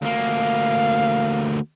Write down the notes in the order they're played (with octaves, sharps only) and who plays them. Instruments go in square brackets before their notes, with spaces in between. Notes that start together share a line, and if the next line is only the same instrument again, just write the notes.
[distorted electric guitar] D2 A#3 [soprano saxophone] F5